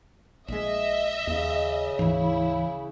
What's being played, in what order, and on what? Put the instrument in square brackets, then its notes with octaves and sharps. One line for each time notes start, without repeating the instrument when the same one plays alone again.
[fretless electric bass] A#1 G#3 [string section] D#5 E5
[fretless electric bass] D#2 [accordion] C#3
[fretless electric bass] D2 G#2 [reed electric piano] E3 [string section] E4